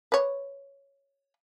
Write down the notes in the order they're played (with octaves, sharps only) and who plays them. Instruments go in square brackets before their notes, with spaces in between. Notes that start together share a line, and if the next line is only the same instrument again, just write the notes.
[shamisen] B4 C#5